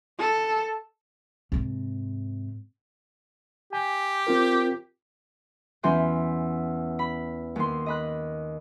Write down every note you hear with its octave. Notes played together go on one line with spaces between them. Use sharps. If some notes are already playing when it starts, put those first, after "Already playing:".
A4
G#2 C3
G4 G#5
C4 F4 A#4
E2 E3 C#4 C6 G6
B5
D#2 C6
D#5 B5 F#6